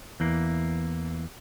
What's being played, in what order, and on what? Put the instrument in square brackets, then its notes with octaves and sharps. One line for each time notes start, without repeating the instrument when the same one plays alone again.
[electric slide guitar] E2 E3 A#3